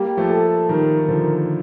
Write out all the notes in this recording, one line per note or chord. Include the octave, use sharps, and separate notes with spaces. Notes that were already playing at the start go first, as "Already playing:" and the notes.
Already playing: G3 A#3 G4
F3 A3
A4
D#3 G3 A#4
D#3
D3 F3